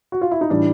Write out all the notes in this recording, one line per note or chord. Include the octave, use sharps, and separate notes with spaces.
F#4
F4
E4
D#4
A2 E3 G3 D4